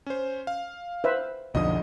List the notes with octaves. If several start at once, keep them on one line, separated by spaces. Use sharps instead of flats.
C#4 C5
F5
B4 C5 E5
B1 F2 D3 D#5 D#6